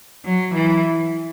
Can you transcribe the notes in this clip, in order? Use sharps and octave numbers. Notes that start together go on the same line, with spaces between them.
F#3
E3